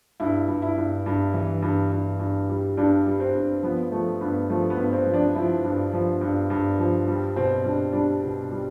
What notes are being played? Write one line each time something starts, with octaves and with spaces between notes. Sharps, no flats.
G2 E4
G2
E4
G2
G2
E3
G2
G2
G2
G3
G2 D4
G3
C4
G2
F3 B3
F3 A3
G2 B3
F3 A3
B3
G2
C4
F3
D4
F3 E4
G2
F3
G2
G2
F3
G3
B2 C4
G3 D4
G3 D4
B2
G3